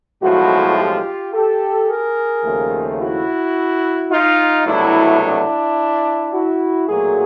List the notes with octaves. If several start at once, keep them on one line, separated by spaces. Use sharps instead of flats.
B1 A2 F3 G#3 E4 F#4
F4 G4
G4 A4
G#4 A#4
D#2 C#3 F3 A3
E4 F#4
D#4 F4
C2 B2 F#3 A3 D4 E4
D4 E4
E4 F#4
B1 A#2 F#3 A3 F#4 G#4